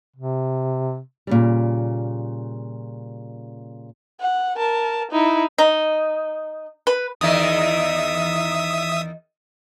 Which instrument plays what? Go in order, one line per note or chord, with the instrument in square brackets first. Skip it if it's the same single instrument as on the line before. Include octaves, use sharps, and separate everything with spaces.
[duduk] C3
[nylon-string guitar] A#2 C#3 G3
[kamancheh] F#5
A#4 A5
D#4 E4
[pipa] D#4
B4
[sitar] E2 D#3 [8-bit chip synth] E5 D#6